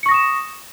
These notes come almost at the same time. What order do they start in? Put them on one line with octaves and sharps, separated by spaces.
C#7 C#6 A#6 D#6 E7